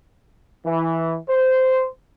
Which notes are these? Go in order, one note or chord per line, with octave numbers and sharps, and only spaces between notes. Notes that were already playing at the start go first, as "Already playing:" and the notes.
E3
C5